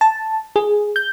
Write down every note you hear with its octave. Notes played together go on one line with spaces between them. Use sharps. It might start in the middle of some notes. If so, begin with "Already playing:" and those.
A5
G#4
G6